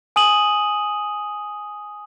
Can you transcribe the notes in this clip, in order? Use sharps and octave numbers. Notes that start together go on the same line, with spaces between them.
G#5 D#6 D#7 F#7